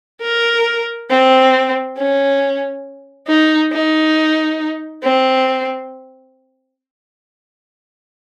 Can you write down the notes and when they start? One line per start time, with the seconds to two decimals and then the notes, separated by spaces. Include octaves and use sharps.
0.22 A#4
1.10 C4
1.97 C#4
3.28 D#4
3.72 D#4
5.03 C4